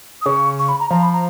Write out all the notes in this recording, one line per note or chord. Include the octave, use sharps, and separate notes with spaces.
D#6
C#3 C#6
C#6
B5
A#5
F3 A#5
B5
A#5